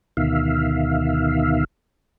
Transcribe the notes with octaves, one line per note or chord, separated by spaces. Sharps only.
D2 B2 D#3 E5 F5